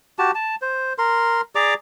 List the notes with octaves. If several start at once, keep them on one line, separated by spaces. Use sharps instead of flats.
F#4 G4 A5
A5
C5
A#4 C6
G#4 D5 A#5 D6